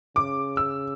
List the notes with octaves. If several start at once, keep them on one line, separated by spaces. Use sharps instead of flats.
C#3 D6
E6